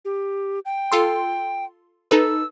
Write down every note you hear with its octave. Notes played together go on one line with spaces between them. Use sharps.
G4
G5
F4 A4 C6
D#4 A4 B4 E6